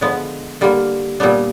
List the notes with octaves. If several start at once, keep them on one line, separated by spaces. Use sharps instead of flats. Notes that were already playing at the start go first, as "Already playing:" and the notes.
D3 F3 G#3 B3
D3 G3 A#3
A#2 G3 B3 D4